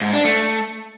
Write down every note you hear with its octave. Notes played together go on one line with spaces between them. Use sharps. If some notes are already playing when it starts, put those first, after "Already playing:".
G#2
D4
A3